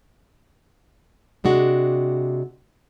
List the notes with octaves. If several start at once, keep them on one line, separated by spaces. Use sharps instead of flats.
C3 G#3 D4 F#4